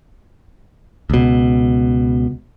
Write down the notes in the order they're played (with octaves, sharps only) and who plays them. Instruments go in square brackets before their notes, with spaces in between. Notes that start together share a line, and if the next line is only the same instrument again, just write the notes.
[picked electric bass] C#2 B2